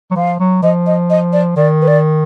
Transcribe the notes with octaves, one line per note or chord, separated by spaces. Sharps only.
F#3
F3 F5
F#3
F3 D#5
D#5
D#5
D5
D#3 D5
B4
D5